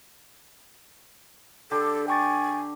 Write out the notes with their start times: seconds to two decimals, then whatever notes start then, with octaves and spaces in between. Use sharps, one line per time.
1.71 D3 G4 A4
2.08 G5 G#5 C#6 A6